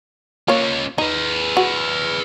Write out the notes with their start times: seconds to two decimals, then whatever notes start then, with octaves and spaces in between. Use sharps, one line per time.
0.48 A#3 C#4 F4 C#5
0.98 D#4 G#4 B4
1.57 F#4